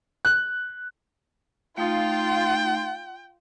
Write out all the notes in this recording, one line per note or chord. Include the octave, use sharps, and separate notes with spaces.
F#6
A3 D#4 F4 G5